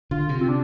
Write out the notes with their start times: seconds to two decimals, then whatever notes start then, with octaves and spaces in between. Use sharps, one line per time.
0.11 D3 F4
0.29 C3
0.41 C4
0.48 D4